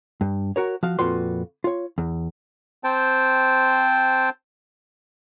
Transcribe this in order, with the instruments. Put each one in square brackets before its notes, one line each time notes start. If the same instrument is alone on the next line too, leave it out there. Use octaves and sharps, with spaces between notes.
[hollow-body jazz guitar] G2
F#4 A#4 C#5
F3 F#4 F5
F2 A#2 F4 F#4 B4 C6
F4 C#5
E2
[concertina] C4 C5 G5 A5